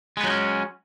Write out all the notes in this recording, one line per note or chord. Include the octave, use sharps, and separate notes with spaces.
F#3 G#3 B3 C#4 D#4